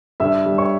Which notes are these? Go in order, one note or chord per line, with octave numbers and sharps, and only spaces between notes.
G2 E5 E6
G3
C#5 C#6